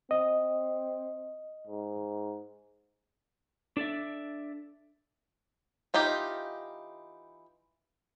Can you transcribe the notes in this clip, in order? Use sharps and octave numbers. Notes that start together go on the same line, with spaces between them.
C4 D#5
G#2
D4 A4 D5 E5
E3 D#4 F4 G4